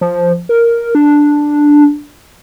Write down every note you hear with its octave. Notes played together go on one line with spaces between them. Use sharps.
F3
A#4
D4